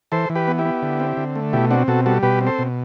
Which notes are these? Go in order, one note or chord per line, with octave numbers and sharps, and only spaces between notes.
E3 A4 C5
E3
G4 B4
B3
E4 G4
B3
D3
C4
D3
A3
B2 E4 G4
C4 D4 F#4
B2 F#4 A4
G3 F#4 A4
B2 G4 B4
C4
A4 C5
B2